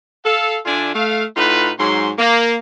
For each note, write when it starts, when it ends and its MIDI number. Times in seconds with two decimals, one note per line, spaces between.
0.25 0.58 69
0.25 0.58 77
0.65 0.94 50
0.65 0.94 62
0.65 0.94 65
0.65 0.94 74
0.65 0.94 76
0.65 0.94 80
0.94 1.23 57
0.94 1.23 77
1.36 1.71 45
1.36 1.71 63
1.36 1.71 65
1.36 1.71 66
1.36 1.71 71
1.79 2.11 44
1.79 2.11 54
1.79 2.11 84
2.18 2.56 58